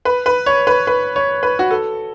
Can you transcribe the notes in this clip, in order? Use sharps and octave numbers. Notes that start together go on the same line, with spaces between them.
B4
B4
C#5
B4
B4
C#5
B4
F#4
A4